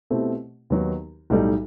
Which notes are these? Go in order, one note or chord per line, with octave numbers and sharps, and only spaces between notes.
B2 A3 C4 E4 G4
D#2 D#3 F#3 B3 D#4
B1 A2 G3 D#4 A4